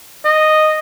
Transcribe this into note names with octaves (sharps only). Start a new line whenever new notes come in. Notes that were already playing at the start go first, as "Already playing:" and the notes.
D#5